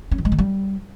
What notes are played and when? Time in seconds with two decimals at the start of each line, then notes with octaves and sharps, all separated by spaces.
0.12 C#4
0.18 D#3
0.25 G#3
0.32 D#3
0.39 G3